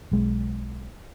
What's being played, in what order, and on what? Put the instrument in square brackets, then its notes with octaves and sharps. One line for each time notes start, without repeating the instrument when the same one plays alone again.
[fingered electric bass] B1 G#3